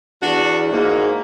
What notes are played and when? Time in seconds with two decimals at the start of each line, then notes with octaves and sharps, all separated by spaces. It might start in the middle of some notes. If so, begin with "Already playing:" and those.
0.22 E2 D4 F#4
0.72 G#2 A#3